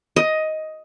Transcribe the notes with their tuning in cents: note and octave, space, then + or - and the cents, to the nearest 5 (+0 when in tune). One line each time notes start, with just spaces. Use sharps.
D#5 +10